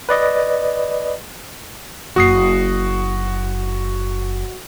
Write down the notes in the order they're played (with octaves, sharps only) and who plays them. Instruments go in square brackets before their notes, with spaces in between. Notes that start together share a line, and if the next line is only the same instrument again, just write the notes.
[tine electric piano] B4 D5 D#5
[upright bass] F#1 [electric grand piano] F#4 D#6 C7